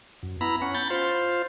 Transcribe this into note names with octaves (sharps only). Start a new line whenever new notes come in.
F#2
B3 E4 A#5 B5
C#4 F#5
B5 G6 A6
F4 C5